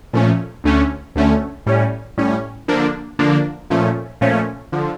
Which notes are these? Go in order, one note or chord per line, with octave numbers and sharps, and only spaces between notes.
A#2 F3 A3 C#4
D2 D3 A3 C#4
D2 D3 A3 C#4
A2 G3 C#4
A2 G3 C#4
D3 F3 A#3 D4
D3 F3 A#3 D4
A#2 F3 A3 C#4
A#2 F3 A3 C#4
D3 F3